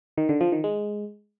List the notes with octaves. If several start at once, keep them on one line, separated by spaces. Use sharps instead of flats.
D#3
D3
F3
D#3
G#3